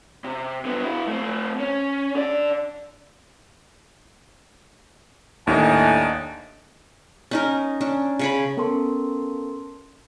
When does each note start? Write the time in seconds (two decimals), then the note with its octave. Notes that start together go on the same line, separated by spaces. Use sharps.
0.24 C3
0.65 D3 B3
0.84 E4 F#4
1.07 A3 C4
1.60 C#4
2.15 D3 D5
5.47 D#2 A2 D4 D#4 G#5
7.31 C#4 D#4 A#4
7.81 C#4 D4
8.19 C#3 C#5 B5
8.57 B3 C#4 A4 A#4 A5 C6